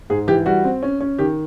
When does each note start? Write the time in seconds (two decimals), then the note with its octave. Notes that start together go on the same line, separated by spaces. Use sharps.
0.10 G#2 G#4
0.28 E3 G4
0.46 G3 F#4
0.64 C4
0.83 C#4
1.01 C#4
1.19 D#3 G4